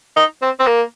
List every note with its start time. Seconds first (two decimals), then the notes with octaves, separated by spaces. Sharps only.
0.17 D#4
0.42 C4
0.60 C4
0.67 A#3